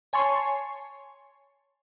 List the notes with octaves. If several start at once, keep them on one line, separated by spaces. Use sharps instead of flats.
C#5 G#5 A5 C6 C#6